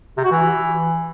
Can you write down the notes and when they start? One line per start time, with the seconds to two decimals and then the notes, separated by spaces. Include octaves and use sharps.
0.17 C3
0.24 F#4
0.31 E3